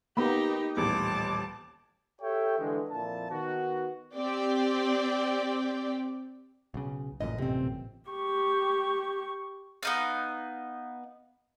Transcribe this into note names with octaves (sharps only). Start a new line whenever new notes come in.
A#3 B3 D#4 G4 A#4 B5
D#1 A1 B3 A5 D6
G4 A4 C#5 E5 G5
D3 E3 G#3
F2 A#2 E4 A5
D#3 B3 F#4
C4 G4 D5 G5
B1 C#3
A1 F#2 A#2 D#5
C3 C4
G4 C#6
B3 D#4 F5